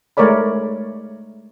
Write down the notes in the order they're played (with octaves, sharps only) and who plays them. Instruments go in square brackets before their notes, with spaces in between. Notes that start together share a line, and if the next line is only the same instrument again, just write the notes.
[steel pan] G#3 A3 A#4 C#5 D5 B5